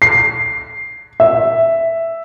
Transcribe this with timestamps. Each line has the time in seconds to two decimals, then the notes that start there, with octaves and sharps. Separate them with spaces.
0.02 C7
1.20 E5